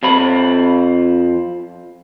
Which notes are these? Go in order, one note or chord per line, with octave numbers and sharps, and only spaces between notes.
F2 C4 B5